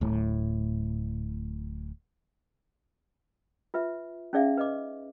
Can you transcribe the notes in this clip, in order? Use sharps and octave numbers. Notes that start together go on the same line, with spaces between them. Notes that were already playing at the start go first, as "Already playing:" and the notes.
D1 A2
F4 B4 E5
C#4 D#4 G#4 D5 E5 F5
B4 D#5 D6